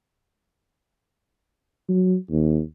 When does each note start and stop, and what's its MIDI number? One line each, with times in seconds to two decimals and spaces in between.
1.89 2.15 54
2.31 2.61 39